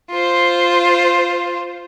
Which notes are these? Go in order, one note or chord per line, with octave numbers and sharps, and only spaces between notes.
F4 C5